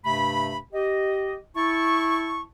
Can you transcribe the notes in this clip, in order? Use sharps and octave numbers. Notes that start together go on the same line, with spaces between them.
G2 C3 A3 B5
G4 D#5
E4 A5 C#6